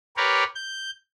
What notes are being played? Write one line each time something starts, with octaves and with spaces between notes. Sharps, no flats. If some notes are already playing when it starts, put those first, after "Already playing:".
G4 A#4 B4 C#5 D5
G6